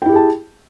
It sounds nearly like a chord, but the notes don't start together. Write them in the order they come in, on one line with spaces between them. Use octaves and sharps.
G5 E4 G4 G#4 A5